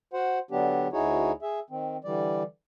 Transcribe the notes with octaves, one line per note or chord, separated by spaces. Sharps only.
F#4 C5 F#5
D3 F#3 B3 D4 G4
D2 D#4 E4 F#4 G#4 C#5
G#4 E5
D#3 C4
D3 E3 G3 D5